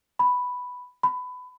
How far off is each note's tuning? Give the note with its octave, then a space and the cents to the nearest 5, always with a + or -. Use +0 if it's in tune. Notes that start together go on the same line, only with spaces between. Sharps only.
B5 +0
B5 +20